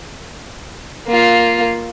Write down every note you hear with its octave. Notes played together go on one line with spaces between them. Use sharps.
A#3 F4